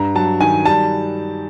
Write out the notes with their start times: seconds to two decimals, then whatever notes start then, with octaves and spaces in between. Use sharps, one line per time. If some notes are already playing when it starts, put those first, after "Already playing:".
Already playing: G2 A#5
0.15 F#3 A5
0.40 D#3 G#5
0.65 G3 A5